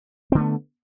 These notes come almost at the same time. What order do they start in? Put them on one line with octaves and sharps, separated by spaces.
C4 D3 A3 B3